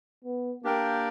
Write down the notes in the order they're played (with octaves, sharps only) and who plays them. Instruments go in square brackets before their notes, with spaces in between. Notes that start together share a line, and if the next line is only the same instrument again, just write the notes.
[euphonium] B3
[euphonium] A#3 [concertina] D4 G4 A#4 D5 G5